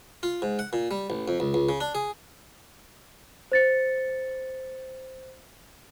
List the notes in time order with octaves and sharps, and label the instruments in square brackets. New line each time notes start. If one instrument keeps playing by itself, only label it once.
[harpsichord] F4
G#2
F#5
A#2
G3
A1
F2
C#2
C#2
C#3
D4
G#4
[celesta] C5 A6 C#7